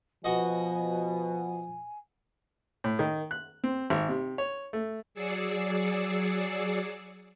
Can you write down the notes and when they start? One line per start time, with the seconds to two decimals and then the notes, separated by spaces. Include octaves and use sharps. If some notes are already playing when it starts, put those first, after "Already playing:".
0.24 B2 F3 F#4 D#5 G#5
2.84 A2
2.99 D#3
3.31 F#6
3.64 C4
3.90 G#1
4.09 C3
4.38 C#5
4.73 A3
5.14 F#3 G#4 D5 E6 C7 C#7